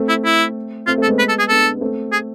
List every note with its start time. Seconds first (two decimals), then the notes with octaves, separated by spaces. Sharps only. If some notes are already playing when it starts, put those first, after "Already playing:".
Already playing: A3 C4
0.09 E4
0.25 E4
0.87 A3 C4 F4
0.98 A3 C4 A4
1.07 G#3 B3
1.19 B4
1.29 A4
1.39 G#4
1.49 B3 D4 A4
1.75 B3
1.81 A3 C4
2.12 G#4